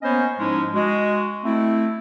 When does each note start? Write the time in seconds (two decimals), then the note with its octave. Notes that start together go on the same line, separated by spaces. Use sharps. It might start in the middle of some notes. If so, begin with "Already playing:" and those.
0.02 A#3 B3 C#4 C5 C#5 D#5
0.39 G#2 F3 G#3 C#4 D#4 E4
0.74 G#3 F#4
1.44 A3 C4 E4